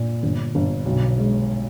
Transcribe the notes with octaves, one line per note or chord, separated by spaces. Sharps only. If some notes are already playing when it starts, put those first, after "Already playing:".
Already playing: A#2
G1
G1
B1
G#3